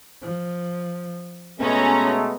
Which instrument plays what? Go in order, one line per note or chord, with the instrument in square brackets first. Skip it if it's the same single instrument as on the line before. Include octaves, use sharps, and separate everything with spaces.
[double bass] F3
[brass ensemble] B2 G#3 A3 [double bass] B3 [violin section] C#4 A#5